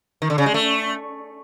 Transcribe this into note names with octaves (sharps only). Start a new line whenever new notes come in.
D#3
D3
C#3
G#3
A3